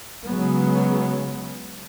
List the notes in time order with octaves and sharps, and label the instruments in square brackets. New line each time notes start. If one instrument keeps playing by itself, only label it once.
[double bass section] C#3 F#3 G#3 B3